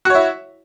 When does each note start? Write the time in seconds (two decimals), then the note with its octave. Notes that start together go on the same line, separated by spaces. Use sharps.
0.05 F#4
0.10 C#5
0.15 E4